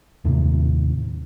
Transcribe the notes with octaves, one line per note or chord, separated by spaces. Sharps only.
D#2 A2 C3